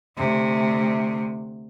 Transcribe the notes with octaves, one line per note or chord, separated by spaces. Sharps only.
D2 C3